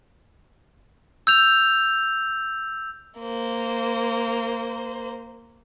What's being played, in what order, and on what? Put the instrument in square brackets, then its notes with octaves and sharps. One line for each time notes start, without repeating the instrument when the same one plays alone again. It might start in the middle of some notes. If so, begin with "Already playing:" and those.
[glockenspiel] E6 G6 F7
[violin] A#3 C5